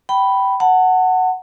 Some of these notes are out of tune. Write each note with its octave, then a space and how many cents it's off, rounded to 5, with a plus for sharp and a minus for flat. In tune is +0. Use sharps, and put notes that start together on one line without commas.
G5 -20 B5 +0
F#5 +0 A5 +40